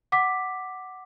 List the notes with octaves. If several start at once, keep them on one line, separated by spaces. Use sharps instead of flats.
F#5 D6 B6